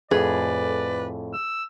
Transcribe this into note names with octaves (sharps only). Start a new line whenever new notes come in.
F2 A2 G#4 B4 D5
E6